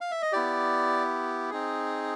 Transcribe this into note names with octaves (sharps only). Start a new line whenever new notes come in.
F5
E5
D#5
B3 E4 G4 D5
C4 D#4 G#4